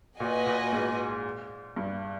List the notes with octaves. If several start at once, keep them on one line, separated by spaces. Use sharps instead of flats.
A#2 F#4 B4 D#5 G#5
A#2
G#2
G2